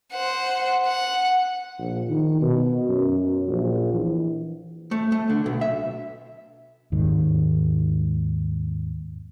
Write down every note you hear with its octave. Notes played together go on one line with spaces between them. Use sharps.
C5 F#5
F#5
A#1
D#3
B2
F#2
A#1
E3
A3
A3
D3
B1
E5
D#2 G#2 D#3